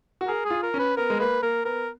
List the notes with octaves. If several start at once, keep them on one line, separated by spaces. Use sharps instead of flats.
F#4
G#4 A#4
G#4
F4
A#4
C#4
B4
B3 A#4
G#3
A#3 B4
A#3 A#4
B3 A#4